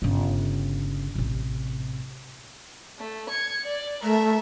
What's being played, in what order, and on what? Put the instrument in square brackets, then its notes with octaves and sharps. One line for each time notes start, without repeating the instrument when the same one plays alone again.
[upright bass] G1 C#3
A1 C3
[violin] A3
G#6 C#7
D5
[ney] A3 [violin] A#4 E5